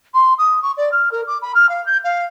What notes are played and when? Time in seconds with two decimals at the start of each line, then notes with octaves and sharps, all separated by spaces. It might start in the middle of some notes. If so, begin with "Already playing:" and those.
0.14 C6
0.38 D#6
0.62 C#6
0.77 D5
0.91 F6
1.11 A#4
1.27 D6
1.42 B5
1.54 F6
1.69 F5
1.86 G6
2.04 F5